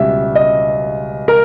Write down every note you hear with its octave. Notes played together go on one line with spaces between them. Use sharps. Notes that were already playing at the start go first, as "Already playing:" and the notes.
Already playing: C#2 B2 G3 E5
D#5
A#4